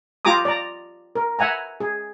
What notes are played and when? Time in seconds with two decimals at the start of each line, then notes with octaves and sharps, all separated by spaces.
0.25 F4 G4 A#5 D6 D#6
0.45 D5 A#5
1.15 A#4
1.39 E5 F#5 G#5 A#5
1.80 G#4